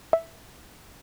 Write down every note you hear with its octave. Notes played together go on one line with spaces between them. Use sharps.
E5